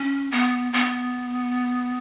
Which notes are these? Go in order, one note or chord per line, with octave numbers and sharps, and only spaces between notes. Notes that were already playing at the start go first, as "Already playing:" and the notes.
Already playing: C#4
B3
B3